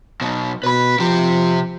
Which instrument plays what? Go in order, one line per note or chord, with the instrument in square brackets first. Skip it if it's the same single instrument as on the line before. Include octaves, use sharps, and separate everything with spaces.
[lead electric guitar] B2 F#3
[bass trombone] B2 [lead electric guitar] B4 B5
[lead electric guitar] C3 G4 [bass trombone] F3